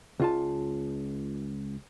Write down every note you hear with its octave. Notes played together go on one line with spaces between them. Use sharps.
C#2 F4 A5